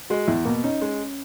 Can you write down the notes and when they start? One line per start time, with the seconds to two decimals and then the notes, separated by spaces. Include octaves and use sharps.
0.10 G#3 F#4
0.28 E2 E4
0.45 B2 A#3
0.64 C#4 D#4
0.82 G#3